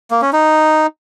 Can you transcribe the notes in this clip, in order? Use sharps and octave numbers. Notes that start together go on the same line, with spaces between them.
A#3
C#4
D#4